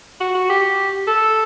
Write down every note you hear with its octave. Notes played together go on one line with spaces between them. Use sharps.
F#4
F#4
G4
A4